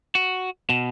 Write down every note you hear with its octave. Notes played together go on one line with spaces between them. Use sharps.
F#4
B2